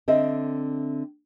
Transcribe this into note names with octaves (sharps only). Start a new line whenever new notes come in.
D3 C4 D#5 E5